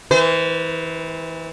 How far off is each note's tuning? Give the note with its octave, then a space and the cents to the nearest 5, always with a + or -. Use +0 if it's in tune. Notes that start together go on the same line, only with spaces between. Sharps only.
E3 -25 C5 -45